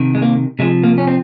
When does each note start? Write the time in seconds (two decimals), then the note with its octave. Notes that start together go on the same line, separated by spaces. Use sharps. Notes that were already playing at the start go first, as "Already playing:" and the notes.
Already playing: C3 D#3
0.15 G#3
0.22 A#3
0.59 C3 F3 G#3
0.84 A#3
0.98 C#4
1.07 C4